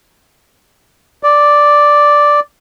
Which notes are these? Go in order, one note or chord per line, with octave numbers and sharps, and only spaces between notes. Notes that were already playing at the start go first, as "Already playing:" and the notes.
D5